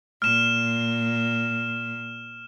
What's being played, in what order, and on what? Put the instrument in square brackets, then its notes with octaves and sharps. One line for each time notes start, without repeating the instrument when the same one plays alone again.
[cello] A#2 [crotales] F6 E7